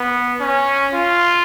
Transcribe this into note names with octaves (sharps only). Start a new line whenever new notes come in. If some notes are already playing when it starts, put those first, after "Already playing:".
Already playing: B3
C#4
F4